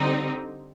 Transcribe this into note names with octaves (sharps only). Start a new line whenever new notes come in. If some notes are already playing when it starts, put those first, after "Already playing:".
Already playing: D3 G3 C4 D#4